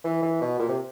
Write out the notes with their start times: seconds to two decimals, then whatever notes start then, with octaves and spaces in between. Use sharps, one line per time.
0.04 E3
0.22 E3
0.41 B2
0.59 A#2
0.69 C3